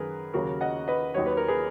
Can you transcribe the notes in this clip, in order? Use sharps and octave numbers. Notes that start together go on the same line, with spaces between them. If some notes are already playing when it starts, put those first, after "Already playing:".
Already playing: F#2 D#3 G#4 A#4 B4
D#2 C#3 F#3 F#4 A#4
D#5 F#5
B4 D#5
D#2 D#3 F#3 C#5
B4
A#4
G#4 B4